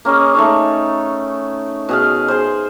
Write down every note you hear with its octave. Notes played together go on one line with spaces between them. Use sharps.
A#3 C#4 G#4 D#5
A3 D#4 C#5
B2 G#4 F5
G#4 C5